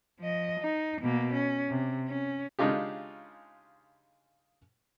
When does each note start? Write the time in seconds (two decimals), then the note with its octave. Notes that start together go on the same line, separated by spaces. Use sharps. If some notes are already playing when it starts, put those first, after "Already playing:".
0.20 F3 D#5
0.60 D#4
1.02 B2 A#3
1.34 C#4
1.70 C3
2.08 C#4
2.59 C#3 G#3 D4 D#4 F4 G4